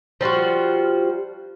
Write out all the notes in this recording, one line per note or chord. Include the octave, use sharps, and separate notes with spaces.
F3 G3 F4 F#4